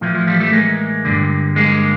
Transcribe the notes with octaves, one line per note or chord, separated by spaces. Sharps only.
A2 E3 F3
F3
F3 G3
G3 A3
G#3 A#3
G2 D3
G#3 A#3